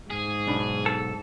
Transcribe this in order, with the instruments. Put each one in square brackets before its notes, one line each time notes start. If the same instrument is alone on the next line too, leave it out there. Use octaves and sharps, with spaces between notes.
[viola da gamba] G#2 [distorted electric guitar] G#4
[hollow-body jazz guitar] B1 D4 B5
[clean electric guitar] A4